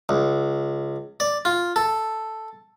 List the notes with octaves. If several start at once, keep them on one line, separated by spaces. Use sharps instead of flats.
C#2
D5
F4
A4